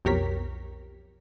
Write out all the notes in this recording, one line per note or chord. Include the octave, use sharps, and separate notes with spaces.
B1 F2 G4 A#4 C#5 B6